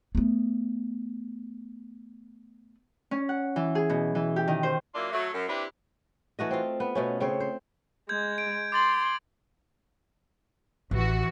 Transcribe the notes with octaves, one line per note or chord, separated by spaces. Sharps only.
A3 B3
C#4
F#5
E3
G#4
B2
E3
G4
D#3
C5
F#3 A#3 D4 E4 F4
F#3 A3
F#2
C4 D4 E4 G4 B4
E3 A3 F#4 D#5
C4 F4
B3
B2 A3 C#4
C#3 C4 C#5
C5
G#3 G6 G#6
D7
C6 D6 A6 F#7
A1 E3 F#4